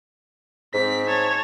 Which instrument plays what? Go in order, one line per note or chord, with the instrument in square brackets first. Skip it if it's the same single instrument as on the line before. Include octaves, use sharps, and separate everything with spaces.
[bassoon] G#2 [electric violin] C4 B6
[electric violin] C#5 A5